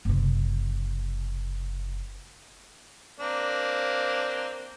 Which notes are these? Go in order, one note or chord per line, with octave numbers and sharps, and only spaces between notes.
F#1 C3
A#3 C4 D4